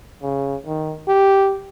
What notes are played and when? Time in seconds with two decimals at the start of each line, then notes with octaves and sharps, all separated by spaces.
0.23 C#3
0.67 D#3
1.08 G4